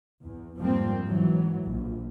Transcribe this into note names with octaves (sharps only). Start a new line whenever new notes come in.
E2
F2 G#2 F3 G3 A#3 C4
G#2 E3 F#3
A#1